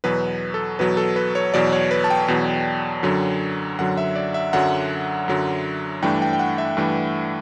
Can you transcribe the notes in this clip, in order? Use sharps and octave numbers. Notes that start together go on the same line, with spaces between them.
E2 B2 F#3 B4
A4
E2 B2 F#3 B4
A4
B4
C#5
E2 B2 F#3 D5
C#5
B4
A5
G5
E2 B2 F#3
F#2 D3 F#3
F#2 D3 F#3 F#5
E5
D5
E5
F#2 D3 F#3 F#5
F#2 D3 F#3
G2 E3 A3 D4 G5
G5
G5
F#5
E5
G2 E3 A3 D4